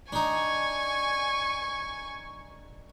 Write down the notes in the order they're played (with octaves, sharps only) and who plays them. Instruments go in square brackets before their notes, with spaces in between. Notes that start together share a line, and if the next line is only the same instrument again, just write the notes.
[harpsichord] D4 D#4 [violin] G#5 C#6